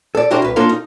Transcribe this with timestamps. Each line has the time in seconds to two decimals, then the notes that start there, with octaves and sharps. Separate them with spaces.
0.15 A4 D5
0.31 D4 E4 F#4 G4 A#4 C5
0.42 C2 B4
0.56 A#3 D4 F4 A4 A#4
0.69 D#4